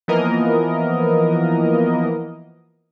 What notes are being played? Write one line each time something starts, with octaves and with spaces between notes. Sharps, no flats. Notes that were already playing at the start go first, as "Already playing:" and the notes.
E3 F3 A#3 B3 A#4 D#5